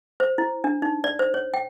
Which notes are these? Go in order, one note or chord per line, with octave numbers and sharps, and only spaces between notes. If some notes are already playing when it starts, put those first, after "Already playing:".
C5
E4
D4
D#4
D5
C5
C#5
G5